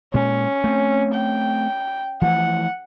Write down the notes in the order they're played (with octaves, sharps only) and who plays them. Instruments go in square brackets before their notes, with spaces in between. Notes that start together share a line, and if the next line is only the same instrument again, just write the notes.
[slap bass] A#2 G#3 [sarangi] C#4
[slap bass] A3 B3 C4
[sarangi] G5
[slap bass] E3 F3 A3 [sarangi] F#5